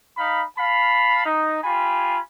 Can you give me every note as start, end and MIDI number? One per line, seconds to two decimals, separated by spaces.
0.17 0.42 63
0.17 0.42 77
0.17 0.42 83
0.58 1.24 77
0.58 1.24 81
0.58 1.24 83
1.25 1.59 63
1.64 2.18 65
1.64 2.18 67
1.64 2.18 80
1.64 2.18 83